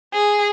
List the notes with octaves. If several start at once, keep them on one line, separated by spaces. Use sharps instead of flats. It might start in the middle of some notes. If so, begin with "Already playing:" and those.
G#4